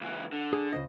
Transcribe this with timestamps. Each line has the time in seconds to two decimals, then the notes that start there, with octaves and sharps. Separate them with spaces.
0.01 C#2 E3
0.32 D3
0.53 G#4
0.72 C#2 C5 D#5